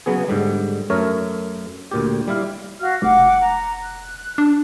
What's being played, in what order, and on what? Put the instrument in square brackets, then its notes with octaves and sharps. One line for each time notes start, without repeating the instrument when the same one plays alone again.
[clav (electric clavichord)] C#3 F#3 B3 G#4
G#2 D3 G3
F#2 A3 A#4 C#5
D2 A#2 G4
G3 E4 F5
[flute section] F#4 F5 F6
[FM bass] F1 [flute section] F#5 D6
[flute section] A#5
F#6
[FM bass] D4